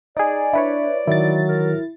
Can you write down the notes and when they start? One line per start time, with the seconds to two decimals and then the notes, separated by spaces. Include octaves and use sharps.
0.17 D#4 G#4 D5
0.53 D4 E4 B4 C#5
1.07 D#3 F#3 E4 A6
1.48 A#4